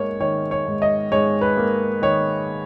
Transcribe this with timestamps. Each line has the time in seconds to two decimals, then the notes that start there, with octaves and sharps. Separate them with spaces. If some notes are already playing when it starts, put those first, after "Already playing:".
Already playing: G#2 A#3 C#5
0.20 D#3 C#5
0.51 C#5
0.67 G#2
0.82 D#5
1.12 G#2 C#5
1.41 B4
1.57 A#3
2.02 D#3 C#5